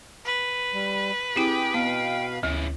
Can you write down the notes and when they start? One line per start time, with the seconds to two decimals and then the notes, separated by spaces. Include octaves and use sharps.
0.25 B4
0.74 G3
1.36 C4 E4 G4 G#4 G5
1.74 B2 B3 F5
2.43 D2 C#3 E3